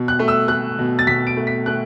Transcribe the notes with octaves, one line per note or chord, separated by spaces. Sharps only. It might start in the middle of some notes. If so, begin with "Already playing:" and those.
Already playing: B2
F#6
A3
E6
A3 F#6
B2
A6
B2 B6
D7
A3
B6
A3 F#6